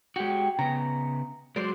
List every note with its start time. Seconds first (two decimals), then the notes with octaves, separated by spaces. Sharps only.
0.16 G#3 F#4 G4
0.59 C#3 B3 A#5
1.56 F#3 G#3 C5 D5